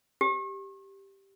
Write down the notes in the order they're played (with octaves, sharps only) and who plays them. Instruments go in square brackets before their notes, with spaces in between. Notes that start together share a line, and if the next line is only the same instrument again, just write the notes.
[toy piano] G4